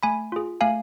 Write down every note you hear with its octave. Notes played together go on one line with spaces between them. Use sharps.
A3 G#5 B5
F4 G#4
A3 F5 G#5